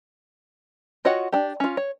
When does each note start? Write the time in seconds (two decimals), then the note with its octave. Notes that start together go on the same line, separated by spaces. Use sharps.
1.05 F4 F#4 C#5 D#5 F#5
1.32 D4 G4
1.60 C#4 F4
1.77 C#5